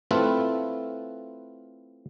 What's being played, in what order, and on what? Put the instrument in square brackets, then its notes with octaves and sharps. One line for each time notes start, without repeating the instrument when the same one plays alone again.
[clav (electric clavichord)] A3 C4 E4 F4 A4 B4